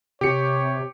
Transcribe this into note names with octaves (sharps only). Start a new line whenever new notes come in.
C3 G4 C#5 C#7